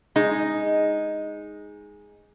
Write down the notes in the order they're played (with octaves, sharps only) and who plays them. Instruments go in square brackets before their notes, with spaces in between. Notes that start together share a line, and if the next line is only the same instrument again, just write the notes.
[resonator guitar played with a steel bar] G#3 D#4